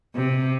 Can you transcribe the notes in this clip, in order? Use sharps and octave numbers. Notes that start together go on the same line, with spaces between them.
C3